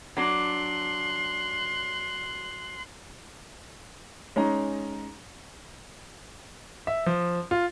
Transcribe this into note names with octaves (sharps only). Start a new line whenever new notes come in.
F#3 D4 C6 F#6
G#3 C#4 D#4 A#5
E5
F3
F4